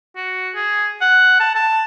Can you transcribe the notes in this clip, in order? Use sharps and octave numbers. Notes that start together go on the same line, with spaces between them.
F#4
G#4
F#5
A5
A5